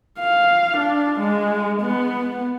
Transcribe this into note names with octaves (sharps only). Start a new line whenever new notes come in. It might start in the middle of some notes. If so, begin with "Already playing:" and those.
F5
D4
G#3
B3